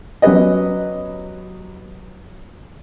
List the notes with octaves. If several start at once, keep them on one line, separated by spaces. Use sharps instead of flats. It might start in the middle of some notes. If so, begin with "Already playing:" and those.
F#3 B3 C#4 G4 B4 D#5